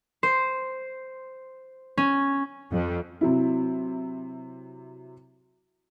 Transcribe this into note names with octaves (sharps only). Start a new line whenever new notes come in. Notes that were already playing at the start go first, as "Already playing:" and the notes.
C5
C#4
F2
C3 F#3 E4